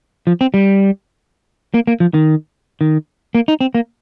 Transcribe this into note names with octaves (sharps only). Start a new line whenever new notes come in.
F3
C4
G3
A#3
A#3
F3
D#3
D#3
A#3
D#4
C4
A#3